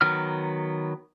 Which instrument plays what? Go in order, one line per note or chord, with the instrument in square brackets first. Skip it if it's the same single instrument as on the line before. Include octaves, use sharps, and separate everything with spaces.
[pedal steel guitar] D#3 F#3 B3 F6